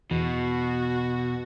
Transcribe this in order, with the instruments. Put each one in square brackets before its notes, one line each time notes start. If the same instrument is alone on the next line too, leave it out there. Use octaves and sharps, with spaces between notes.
[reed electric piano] E2 [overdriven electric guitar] B2 [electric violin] F#4